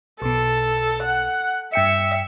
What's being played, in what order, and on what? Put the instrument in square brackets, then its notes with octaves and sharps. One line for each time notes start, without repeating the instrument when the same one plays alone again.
[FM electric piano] B1 B2 [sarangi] A4
[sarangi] F#5
[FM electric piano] G2 G5 C#7 [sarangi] E5